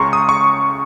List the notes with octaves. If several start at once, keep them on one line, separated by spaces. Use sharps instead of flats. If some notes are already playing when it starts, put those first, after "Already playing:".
Already playing: C#2 C#3 G#3 A#5 C6 C#6
D#6
C#6